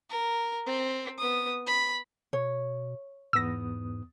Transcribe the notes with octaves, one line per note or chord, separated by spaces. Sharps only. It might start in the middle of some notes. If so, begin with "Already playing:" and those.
A#4
C4
B3 D#6
B5
B2 C#5
E2 G#2 B3 D#6 E6 A#6